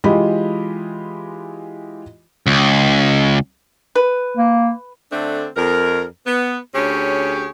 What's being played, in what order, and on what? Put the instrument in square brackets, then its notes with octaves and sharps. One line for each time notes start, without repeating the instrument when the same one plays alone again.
[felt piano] E3 G#3 F4 G4 D#5 B5
[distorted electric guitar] C#2
[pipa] B4
[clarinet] A#3
[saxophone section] D3 A3 C4 D4
F2 A#4
B3
D2 C#4 G4 G#4 C#5